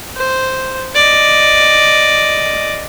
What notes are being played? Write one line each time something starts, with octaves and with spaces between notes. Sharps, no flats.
C5
D5 D#5